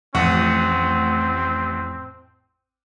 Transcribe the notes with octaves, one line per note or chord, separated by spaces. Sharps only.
A1 F2 A2 C4 F#5 C#6